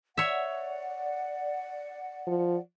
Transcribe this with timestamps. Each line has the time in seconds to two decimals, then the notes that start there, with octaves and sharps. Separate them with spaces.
0.17 C#5 D5 E5 F#5
2.27 F3